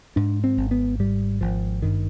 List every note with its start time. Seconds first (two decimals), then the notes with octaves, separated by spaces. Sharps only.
0.16 G#2 D4
0.44 C4
0.57 G#1
0.71 B3
0.99 G#2 G3
1.41 G#1 F3
1.82 G2 D#3